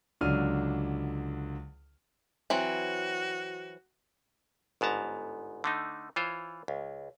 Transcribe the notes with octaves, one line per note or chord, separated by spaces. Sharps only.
C#2 D3 F#3 D4 F6 D#7
E3 F#3 C4 F#4
G1 G#2 B3 A5 A#5
D3 A3 D#4
E3 F4 C5 C#5
C#2